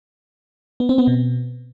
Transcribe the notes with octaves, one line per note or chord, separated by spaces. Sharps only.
B3
C4
B3
B2